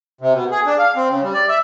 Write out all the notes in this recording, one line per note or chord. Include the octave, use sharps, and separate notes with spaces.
C3
B2
G#4
D4
F5
C4
C#3
G3
D5
E5